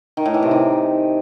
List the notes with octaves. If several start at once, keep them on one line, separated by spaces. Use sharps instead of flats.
D#3
A2
E3
C3
D#3